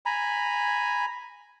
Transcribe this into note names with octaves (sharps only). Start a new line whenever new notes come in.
G#5 A#5 B5